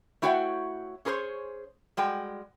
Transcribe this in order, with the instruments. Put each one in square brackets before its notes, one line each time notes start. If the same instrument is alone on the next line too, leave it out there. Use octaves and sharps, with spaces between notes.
[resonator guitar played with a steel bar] A3 E4 F#4 C#5 F#5 G5
C#4 G#4 A#4 C5 C#5
G3 G#3 F#4 G5